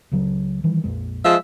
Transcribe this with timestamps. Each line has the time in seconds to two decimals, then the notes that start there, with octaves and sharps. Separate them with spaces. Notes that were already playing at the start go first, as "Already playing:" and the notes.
0.11 C#2 C#3 F#3
0.64 D#3 E3 G3
0.84 A#1 F2 G#3
1.24 F3 G#3 E5